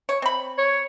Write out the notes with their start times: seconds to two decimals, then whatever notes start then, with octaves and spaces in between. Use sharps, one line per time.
0.09 C#5
0.22 C4 B5
0.58 C#5